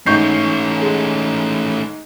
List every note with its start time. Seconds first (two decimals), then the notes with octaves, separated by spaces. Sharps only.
0.06 G#2 A3 C#4 C#6 G6 C7
0.81 G#3